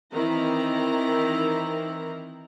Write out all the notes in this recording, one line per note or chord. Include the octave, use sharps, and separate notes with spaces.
D#3 E3 C4 E4 A#5